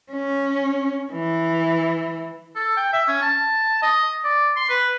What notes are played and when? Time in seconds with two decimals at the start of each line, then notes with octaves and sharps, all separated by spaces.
0.12 C#4
1.12 E3
2.55 A4
2.77 G5
2.93 E5
3.08 C#4
3.22 A5
3.82 D#5
4.24 D5
4.56 C6
4.69 B4